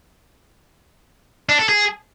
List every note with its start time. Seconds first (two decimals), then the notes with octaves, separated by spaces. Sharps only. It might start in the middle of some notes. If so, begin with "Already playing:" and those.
1.49 D4
1.59 A4
1.69 G#4